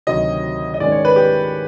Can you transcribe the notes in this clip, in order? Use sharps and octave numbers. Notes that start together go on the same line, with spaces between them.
D2 C3 D#3 F#3 D#5
D#5
G#2 D#3 G#3 C#4 D5
C#5
B4
G4